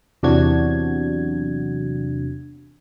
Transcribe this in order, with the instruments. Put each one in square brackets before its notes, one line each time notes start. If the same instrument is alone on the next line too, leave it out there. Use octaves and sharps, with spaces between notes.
[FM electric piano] E2 C3 F#3 D4 F#4 G#6